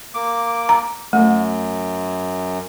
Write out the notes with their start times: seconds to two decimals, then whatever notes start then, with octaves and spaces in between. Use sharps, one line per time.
0.14 A#3 D6
0.69 A#5
1.13 F#2 A3